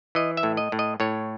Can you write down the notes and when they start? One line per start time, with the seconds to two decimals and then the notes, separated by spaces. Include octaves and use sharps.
0.15 E3 D#5
0.37 E5
0.43 A2
0.57 D#5
0.72 A2
0.79 D#5
1.00 A2 C#5